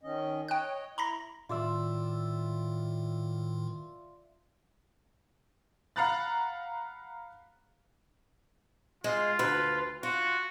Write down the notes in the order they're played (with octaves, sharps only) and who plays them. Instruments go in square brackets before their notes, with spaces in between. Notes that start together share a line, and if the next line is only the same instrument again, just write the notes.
[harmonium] D#3 C#4 D#5
[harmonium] C#5 D#5 [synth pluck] G5 F#6
[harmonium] E4 [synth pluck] A#5 B5 A#6
[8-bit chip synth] A2 D#3 [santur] F4 D5 E5
[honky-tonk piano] F5 F#5 A#5 B5 F#6 A6
[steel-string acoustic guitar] G#3 [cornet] F4
[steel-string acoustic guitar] D2 B4
[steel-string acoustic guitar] F4 [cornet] F#4